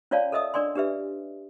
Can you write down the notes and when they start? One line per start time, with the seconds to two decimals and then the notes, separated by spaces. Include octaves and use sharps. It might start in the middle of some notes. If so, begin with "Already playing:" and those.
0.11 C#4 F4 C#5 D5 F5 A5
0.32 A4 A#4 D#5 E5 D#6
0.54 D4 A#4 D5 G#5 C6
0.76 D4 G4 B4 E5